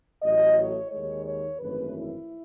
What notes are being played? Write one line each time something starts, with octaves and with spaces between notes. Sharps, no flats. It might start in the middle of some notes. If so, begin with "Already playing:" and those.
A1 A2 F#3 A3 D#5
C#5
D#2 D#3 G#3 C#5
C#5
G#1 F#2 E3 A3 B4
E4